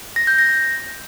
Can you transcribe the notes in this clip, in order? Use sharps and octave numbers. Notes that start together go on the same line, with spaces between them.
A#6
G6
A#6